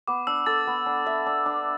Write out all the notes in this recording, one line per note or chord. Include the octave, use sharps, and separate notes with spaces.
B3 D6
D4 E6
A4 A6
B3
D4
E5
D4
D4